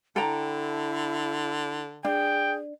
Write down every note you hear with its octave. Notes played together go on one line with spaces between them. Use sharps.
D3 E4 A4 G5 A#5
D4 G#4 G5